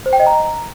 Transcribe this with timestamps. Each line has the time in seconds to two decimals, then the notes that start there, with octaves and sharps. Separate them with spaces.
0.06 C5
0.13 G5
0.20 D#5
0.27 A#5